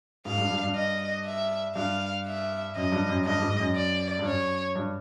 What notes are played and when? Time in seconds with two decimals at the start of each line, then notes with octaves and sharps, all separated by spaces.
0.25 G#2 F5
0.38 G2
0.51 G2
0.63 G2
0.75 D#5
1.25 E5
1.75 G2 F5
2.26 E5
2.76 F#2 D#5
2.92 G2
3.09 F#2
3.25 G2 D#5
3.39 G2
3.42 G#2
3.59 F#2
3.76 D5
4.19 G2
4.25 F#2 C#5
4.75 G2